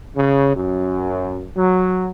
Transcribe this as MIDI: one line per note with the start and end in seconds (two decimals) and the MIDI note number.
0.17 0.55 49
0.56 1.47 42
1.56 2.10 54